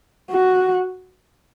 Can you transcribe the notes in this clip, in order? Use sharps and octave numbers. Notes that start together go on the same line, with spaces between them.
F#4